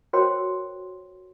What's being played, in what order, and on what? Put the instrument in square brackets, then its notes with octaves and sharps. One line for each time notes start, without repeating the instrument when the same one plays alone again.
[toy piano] F#4 A#4 C5 C#5 G5 C6